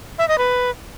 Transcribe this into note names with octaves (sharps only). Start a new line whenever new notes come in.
E5
D#5
B4